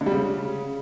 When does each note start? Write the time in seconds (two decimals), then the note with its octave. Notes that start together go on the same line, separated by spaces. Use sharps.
0.01 D3
0.06 G3
0.12 C#3